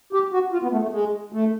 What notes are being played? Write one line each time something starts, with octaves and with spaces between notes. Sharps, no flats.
G4
F#4
F4
B3
A3
A3
G#3
A3